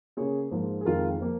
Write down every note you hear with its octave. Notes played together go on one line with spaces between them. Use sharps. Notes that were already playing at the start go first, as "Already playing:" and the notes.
C#3 A#3 G#4 C#5
G#2 F3 A#3
G#4
F2 D#3 G#3 F4 A#4
F3 A#3